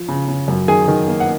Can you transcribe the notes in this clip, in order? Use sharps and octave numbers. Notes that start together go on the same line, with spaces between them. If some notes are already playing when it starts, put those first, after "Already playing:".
Already playing: F3
C#3
C#3
F#2
D#3 G#4 G#5
D#3
A#3
F#5